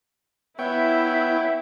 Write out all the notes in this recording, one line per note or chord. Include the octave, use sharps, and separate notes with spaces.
B3 E4 C#5 E5 G5